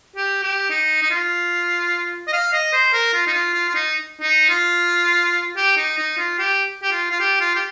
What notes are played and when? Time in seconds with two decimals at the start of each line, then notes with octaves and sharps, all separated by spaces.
0.16 G4
0.43 G4
0.70 D#4
1.02 D#4
1.10 F4
2.27 D#5
2.33 F5
2.53 D#5
2.73 C5
2.93 A#4
3.13 F4
3.27 D#4
3.33 F4
3.54 F4
3.69 F4
3.74 D#4
4.21 D#4
4.49 F4
5.56 G4
5.77 D#4
5.98 D#4
6.18 F4
6.39 G4
6.82 G4
6.92 F4
7.11 F4
7.20 G4
7.40 F4
7.55 G4